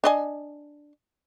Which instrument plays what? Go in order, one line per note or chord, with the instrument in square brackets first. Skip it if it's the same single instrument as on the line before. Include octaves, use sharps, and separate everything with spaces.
[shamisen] D4 D#5 G#5